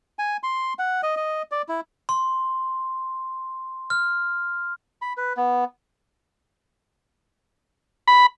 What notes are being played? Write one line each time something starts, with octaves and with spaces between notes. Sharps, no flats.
G#5
C6
F#5
D#5
D#5
D5
E4
C6
F6
B5
B4
B3
B5